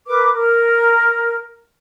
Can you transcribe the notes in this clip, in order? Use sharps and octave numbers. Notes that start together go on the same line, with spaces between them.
A#4 B4 D6
A#4